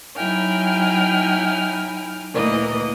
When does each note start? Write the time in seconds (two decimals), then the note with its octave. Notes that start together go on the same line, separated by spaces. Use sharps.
0.16 F#3 D#4 E4 G5 G#5 F6
2.33 D2 A#2 E3 A#3 D#5